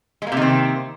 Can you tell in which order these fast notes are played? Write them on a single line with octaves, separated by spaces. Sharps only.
G#3 A#3 C3 D#3 C4